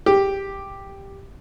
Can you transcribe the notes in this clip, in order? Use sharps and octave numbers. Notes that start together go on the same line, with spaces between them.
G4